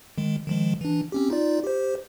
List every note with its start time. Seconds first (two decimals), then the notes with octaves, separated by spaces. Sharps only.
0.18 D#3 G#3
0.47 D#3 F3 G#3
0.81 E3 D4
1.12 C4 C#4 G4
1.30 D#4 F4 D5
1.64 G4 C5